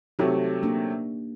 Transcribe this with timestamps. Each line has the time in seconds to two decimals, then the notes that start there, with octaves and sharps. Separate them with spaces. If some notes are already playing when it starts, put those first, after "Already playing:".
0.19 C3 F#3 A3 D#4 G4
0.63 A#3 D4